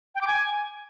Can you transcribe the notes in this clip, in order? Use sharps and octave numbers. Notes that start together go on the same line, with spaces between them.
G5
D6
G#5